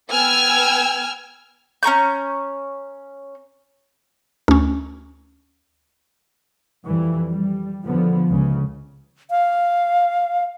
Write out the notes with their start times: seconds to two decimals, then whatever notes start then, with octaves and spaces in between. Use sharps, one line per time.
0.11 B3 G5 G#5 E6 F6 G#6
1.83 C#4 A#5 C#6 G6
4.48 D2 C#4
6.85 F2 E3 G3
7.30 G3
7.84 E2 D3 F3 B3
8.29 C#2 C#3
9.30 F5